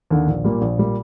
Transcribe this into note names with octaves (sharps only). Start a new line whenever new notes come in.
D#2 D3
A#1
A#2 G3 A#3
A#1
A#2 G3 A#3